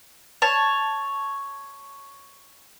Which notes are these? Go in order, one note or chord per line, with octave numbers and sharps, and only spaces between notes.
C#5 A5